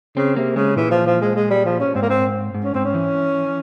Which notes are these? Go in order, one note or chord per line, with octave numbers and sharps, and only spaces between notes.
C#3 C4
C3 A#3
C#3 G#3
A#2 E3
F3
F3
G#3
G#3
G3
F3
C#4
G#2 C4
A#3
C4
G#2
C#4
G#2 C4
C#4
E3